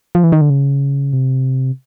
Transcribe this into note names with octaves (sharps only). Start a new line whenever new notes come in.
F3
E3
D#3
D3
C#3
C3